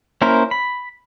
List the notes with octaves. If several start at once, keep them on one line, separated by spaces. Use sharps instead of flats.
A#3 C#4 E4 A#4 C5
B5